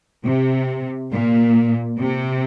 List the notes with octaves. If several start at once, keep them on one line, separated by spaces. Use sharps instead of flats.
C3
A#2
C3